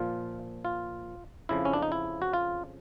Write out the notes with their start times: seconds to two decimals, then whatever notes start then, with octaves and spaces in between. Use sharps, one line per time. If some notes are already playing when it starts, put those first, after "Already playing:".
Already playing: A#2 F3 F4
0.65 F4
1.49 F2 C#3 F3 E4
1.65 C#4
1.73 D4
1.83 D#4
1.92 E4
2.22 F#4
2.33 F4